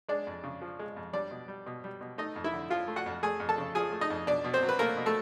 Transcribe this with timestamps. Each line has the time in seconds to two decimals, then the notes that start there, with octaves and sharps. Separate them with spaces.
0.09 G#3 D4 D5
0.27 F2
0.44 C#3
0.62 F3
0.79 G#3
0.97 F2
1.13 G3 D4 D5
1.31 B2
1.48 G3
1.66 B2
1.84 G3
2.01 B2
2.18 A3 D#4 D#5
2.36 F2
2.44 E4 E5
2.54 D3
2.70 F3 F4 F5
2.88 A3
2.96 F#4 F#5
3.06 F2
3.23 A3 G#4 G#5
3.40 F2
3.49 A4 A5
3.58 C#3
3.75 F3 G#4 G#5
3.92 A3
4.01 D#4 D#5
4.10 F2
4.27 B2 D4 D5
4.44 B2
4.54 C4 C5
4.63 F#3
4.69 B4
4.79 A3 A#3 A#4
4.97 B2
5.06 A3 A4